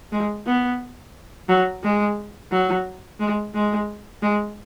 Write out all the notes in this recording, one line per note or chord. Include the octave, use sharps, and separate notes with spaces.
G#3
B3
F#3
G#3
F#3
G#3
G#3
G#3